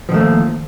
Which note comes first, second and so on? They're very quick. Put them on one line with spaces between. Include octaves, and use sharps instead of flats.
F3 D#3 A3 A#3